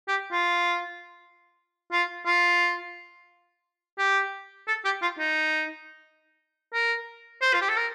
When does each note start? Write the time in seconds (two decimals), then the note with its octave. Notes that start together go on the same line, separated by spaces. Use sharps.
0.08 G4
0.32 F4
1.92 F4
2.26 F4
3.98 G4
4.68 A4
4.85 G4
5.02 F4
5.19 D#4
6.74 A#4
7.42 C5
7.53 F4
7.61 G4
7.69 A4
7.77 A#4